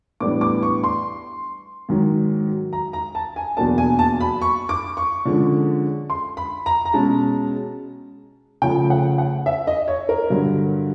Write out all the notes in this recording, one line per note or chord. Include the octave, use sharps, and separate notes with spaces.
A2 E3 G3 B3 D4 D6
D6
C#6
C6
G#2 D#3 F#3
A#5
A#5
A5
G#5
E2 B2 F#3 A#3 D4 A5
G#5
A5
B5
C#6
D6
C#6
D3 F3 G#3 C#4
C6
B5
A#5
A#5
B2 G#3 C#4 A5
C#3 F3 A3 G5
F#5
F#5
E5
D#5
C#5
A#4
G2 D3 F#3